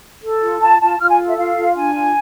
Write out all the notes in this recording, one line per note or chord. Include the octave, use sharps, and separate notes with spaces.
A4
F4
F4 A5
F4 A5
F4 F6
G#5
A4
E5
F4 F5
F4
D4 G#5
F4